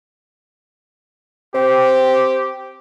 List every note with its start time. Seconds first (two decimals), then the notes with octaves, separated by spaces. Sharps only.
1.54 C4 G4